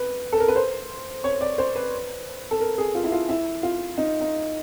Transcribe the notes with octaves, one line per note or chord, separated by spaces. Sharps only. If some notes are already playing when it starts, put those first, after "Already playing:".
Already playing: B4
A4
A#4
B4
C5
C#5
D5
C5
B4
A4
A#4
G#4
F4
E4
F4
E4
F4
D#4
D#4